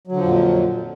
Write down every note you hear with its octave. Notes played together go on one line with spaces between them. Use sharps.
F2 A#2 D3 F3 F#3